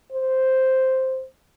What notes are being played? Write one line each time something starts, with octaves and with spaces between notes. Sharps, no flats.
C5